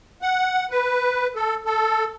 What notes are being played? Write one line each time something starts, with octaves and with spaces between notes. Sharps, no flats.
F#5
B4
A4
A4